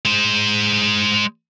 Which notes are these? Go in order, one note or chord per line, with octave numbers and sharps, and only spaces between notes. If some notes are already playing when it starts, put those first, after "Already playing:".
G#3 C5